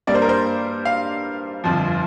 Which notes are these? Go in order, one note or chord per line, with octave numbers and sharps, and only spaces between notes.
G2 G3 A#3 D5
C5
A#4
C5
F5
G1 F2 F3